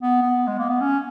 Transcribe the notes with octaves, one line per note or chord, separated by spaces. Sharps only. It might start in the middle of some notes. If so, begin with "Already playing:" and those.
B3
B3
G#3
A#3
B3
C#4